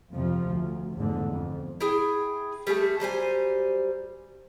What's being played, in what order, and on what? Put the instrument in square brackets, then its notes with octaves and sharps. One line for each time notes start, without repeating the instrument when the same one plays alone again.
[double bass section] F2 C3 F3
D2
A1 E2 G#2 D3
F2
[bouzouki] E4 G#4 G5
G3 A3 G#4 A4
F#3 G3 C5 G#5